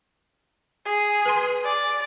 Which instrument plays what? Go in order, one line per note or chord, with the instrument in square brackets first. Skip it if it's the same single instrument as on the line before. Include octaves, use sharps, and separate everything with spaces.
[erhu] G#4
[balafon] B4 G#5 C6
[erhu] D5